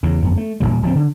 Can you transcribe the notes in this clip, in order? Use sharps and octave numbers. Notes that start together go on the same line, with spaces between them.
E2 C#3
G1 F2 B3
A3
D#1 C#2 A#2 G3
D1 F3 F#3 C4
D3